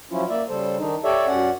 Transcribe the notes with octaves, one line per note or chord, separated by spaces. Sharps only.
F3 F#3 C#4 E4 F4
A#3 D5 E5
C#3 G3 A4 C5
D#3 D4 D#4
G4 A4 C#5 D5 E5
F#2 C#4 D5 F#5